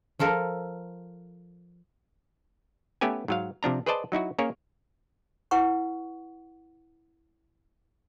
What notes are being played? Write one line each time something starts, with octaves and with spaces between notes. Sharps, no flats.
F3 F4 A4 A#4
A3 B3 C#4 G4 B4 G#5
G#2 F#3 F5
C3 F3 D4 A#5
G#4 B4 C5 D5 D#5 A5
F#3 D#4 E4 F#4
A#3 C#4 G#4 A#4 C#5
E4 B4 F#5 C#6